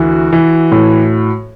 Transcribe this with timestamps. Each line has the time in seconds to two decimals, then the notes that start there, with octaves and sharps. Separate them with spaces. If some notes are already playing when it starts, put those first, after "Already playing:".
Already playing: D2 E3 F#4
0.33 E3
0.72 A2